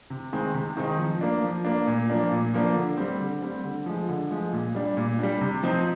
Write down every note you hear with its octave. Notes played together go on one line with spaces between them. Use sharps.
C3
D#3 G#3 C4 D#4
C3
D#3 G#3 C4 D#4
F3
A#3 D4
F3
A#3 D4
A#2
F3 A#3 D4
A#2
F3 A#3 D4
D3
G3 C4
D3
G3 C4
D3
F3 G#3
D3
F3 G#3
A#2
G3 D4
A#2
G3 D4
C3
F3 C4 D#4